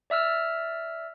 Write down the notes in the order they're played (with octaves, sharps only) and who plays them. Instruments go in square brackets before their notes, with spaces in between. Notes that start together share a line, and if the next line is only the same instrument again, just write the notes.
[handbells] D5 E5 E6 F6